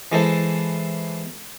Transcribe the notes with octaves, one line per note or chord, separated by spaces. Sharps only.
E3 G#3 E4 A4 C5